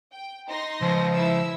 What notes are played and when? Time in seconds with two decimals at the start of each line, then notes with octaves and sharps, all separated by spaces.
0.12 G5
0.47 D#4 C6 A#6
0.82 C#2 F3
1.14 E4 E5 E6